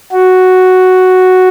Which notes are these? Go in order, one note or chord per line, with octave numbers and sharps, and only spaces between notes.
F#4